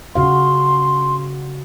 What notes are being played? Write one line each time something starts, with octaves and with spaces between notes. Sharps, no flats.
C#3 F#4 F5 C6